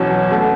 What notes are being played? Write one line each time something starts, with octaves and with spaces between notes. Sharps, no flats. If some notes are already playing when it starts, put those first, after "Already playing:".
Already playing: E2 B2 F#3 C#4
B2 A3 F#4